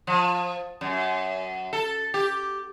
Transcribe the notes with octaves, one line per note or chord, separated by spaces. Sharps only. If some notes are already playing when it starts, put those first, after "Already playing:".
F3
F#2
A4
G4